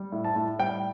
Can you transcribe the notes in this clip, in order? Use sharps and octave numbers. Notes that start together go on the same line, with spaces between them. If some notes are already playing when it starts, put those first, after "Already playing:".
Already playing: G3
A2
A5
A2
G3 G5